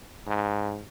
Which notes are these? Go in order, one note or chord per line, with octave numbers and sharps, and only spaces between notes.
G#2